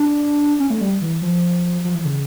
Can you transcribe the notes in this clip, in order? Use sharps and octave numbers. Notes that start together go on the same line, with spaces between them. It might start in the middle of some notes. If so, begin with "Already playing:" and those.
Already playing: D4
C#4
A3
G3
E3
F3
F3
E3
C#3